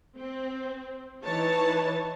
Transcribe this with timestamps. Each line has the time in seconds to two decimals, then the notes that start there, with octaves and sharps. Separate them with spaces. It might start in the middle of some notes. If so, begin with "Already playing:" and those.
0.17 C4
1.23 E3 D#4 C#5 A5